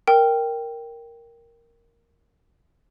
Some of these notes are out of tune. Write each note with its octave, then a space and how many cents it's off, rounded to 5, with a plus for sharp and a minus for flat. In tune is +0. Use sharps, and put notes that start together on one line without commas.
A#4 +0 G5 +0